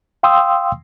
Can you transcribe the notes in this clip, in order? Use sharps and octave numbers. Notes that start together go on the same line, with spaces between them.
F5 G5 C6 D#6 E6